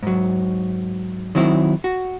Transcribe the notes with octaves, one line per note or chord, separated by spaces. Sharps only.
G#2 F#3
D#3 F#3 C4 E4
F#4